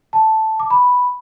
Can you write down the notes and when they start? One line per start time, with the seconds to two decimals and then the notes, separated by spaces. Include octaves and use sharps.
0.13 A5
0.60 D6
0.70 B5